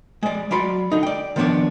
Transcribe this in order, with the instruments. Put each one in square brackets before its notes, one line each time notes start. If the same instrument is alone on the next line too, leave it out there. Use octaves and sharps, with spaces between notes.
[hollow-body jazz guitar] G#3 D5
F#3 D5 B5 C6
D3 D#4
D5 G5
D#3 F3 B3 D4 C#5 D5